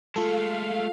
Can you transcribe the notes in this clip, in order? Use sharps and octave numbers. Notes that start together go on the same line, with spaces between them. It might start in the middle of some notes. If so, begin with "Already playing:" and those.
G#3 A3 F4 A4 F5